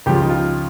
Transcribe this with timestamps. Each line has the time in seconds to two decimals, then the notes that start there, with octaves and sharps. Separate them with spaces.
0.06 C#2 C#3 F3 G4
0.14 F4
0.22 D#4
0.29 F4